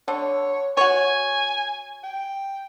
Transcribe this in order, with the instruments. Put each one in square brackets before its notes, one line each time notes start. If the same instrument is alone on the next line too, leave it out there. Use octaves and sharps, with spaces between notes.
[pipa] D3 [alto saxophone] C#5
[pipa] F#4 C#5 [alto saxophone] G#5
[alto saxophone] G5